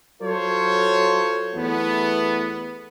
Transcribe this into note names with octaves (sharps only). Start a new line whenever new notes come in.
F#3 F4 A4 C5 C#5
E2 A3 B3